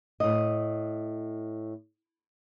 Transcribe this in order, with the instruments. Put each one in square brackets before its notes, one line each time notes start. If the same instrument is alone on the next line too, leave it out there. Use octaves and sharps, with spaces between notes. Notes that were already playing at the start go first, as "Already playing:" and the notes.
[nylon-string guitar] A2 D#5